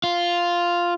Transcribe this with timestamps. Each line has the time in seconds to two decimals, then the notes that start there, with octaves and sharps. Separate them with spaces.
0.04 F4